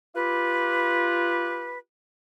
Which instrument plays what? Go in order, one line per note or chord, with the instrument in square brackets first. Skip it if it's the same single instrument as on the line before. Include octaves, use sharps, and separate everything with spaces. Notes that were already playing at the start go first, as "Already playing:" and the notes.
[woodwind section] F4 G4 B4